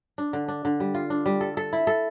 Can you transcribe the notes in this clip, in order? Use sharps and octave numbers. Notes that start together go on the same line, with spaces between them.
D4
D3
D4
D3
G3
F4
D4
G3
A4
A4
E4
A4